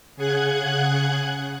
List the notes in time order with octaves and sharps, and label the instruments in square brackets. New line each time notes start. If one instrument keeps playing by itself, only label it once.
[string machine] C#3 G#4 F#5 F#6 G#6